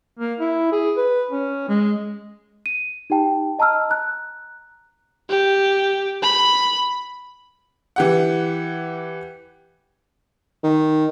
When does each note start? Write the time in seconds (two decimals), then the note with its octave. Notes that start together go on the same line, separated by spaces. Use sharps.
0.19 A#3
0.39 E4
0.72 G#4
0.97 B4
1.31 C#4
1.69 G#3
2.66 D#7
3.10 D#4 G4 G5 A5
3.59 D#5 A5 A#5 E6 F6
3.90 A#5 F#6
5.29 G4
6.22 B5
7.96 E3 G4 F#5
10.64 D#3